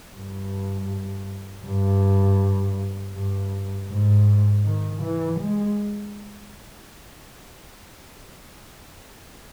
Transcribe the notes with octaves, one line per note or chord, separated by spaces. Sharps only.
G2
G2
G2
G#2
D#3
E3
G#3